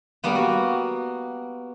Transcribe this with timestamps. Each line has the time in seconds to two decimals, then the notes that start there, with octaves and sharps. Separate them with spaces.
0.24 G3 A#3 B3
0.35 F#4